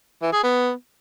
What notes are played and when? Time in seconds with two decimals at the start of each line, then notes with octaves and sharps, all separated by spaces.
0.22 E3
0.33 G#4
0.43 B3